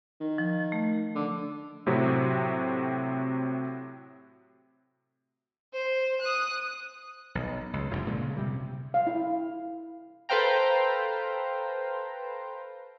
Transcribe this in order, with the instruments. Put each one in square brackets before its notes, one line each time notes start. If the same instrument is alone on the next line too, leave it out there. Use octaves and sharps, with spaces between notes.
[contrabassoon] D#3
[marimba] F3
A3
[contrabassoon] D3
[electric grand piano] A2 C3 F#3 C4
[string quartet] C5
D#6 F#6
[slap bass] B1
C#2
F1 F2 A#2 D3
A#2 D3 G#3
C#3
C3 G3
[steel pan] F5
E4
[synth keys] A4 B4 C5 F5 G5 A#5